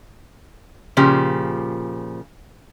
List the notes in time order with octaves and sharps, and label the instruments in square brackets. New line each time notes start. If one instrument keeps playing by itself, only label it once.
[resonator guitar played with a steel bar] A#2 C#3 F3 G4